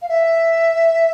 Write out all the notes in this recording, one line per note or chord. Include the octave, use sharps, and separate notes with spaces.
F5
E5